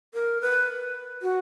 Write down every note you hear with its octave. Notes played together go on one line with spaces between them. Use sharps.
A#4
B4
F#4